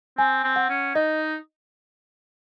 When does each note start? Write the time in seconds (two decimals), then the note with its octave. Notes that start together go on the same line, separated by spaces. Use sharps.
0.18 C4 G#5
0.44 C4
0.56 F#5
0.70 C#4
0.95 D#4 D#5